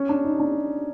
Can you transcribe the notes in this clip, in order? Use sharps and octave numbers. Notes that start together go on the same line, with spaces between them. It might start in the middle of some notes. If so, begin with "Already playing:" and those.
Already playing: C#4
D4
D#4
D4